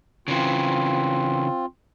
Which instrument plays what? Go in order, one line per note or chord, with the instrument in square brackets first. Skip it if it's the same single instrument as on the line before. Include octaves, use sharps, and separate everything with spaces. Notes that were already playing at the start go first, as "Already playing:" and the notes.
[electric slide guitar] C#3 E3 [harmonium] C4 F4